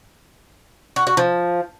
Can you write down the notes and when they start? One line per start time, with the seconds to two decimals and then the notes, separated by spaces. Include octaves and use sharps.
0.96 F#4
1.07 F#4
1.17 F3